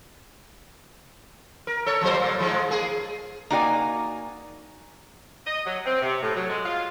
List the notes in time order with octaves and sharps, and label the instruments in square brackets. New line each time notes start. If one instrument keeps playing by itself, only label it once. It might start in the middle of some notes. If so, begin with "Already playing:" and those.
[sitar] A#4
A4 C#5
F3 F#3 C5
A#2
G#2 F3 G#3
A#3 G#4
[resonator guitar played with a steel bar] A#3 D#4 F#4 D5 F#5 G#5
[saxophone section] D#5
F#3
C4
C3
A2
F#3
G#3
F4